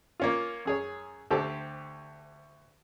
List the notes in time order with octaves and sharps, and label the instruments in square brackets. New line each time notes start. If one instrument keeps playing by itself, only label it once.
[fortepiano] A#3 C#4 F4
F#2 G#4 C#5
D2 G4 A4 C5 A5